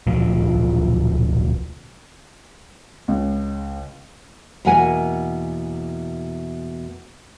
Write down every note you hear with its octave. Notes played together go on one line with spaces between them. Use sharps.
D1 B1 A#2 F3
C#2
E2 B2 A#3 A#4 F#5 G#5